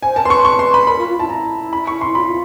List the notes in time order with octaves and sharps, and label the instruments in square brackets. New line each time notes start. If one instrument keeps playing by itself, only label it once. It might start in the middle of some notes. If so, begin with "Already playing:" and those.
[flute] C5 [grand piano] G#5
[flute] A#4 [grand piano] A5
[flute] B4 [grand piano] C6
[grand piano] C#6
C#6
C6
B5
[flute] A#4 [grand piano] B5
[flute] F4
F4
[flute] E4 [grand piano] A5
[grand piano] A#5
B5
C#6
C6
[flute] F4 [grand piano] B5
[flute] E4
F4